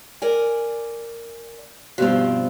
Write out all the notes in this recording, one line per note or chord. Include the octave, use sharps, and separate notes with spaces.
A#4 D5 G#5
G2 B2 F3 C4 F#4